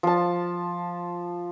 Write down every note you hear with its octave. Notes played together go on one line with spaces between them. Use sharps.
F3 A5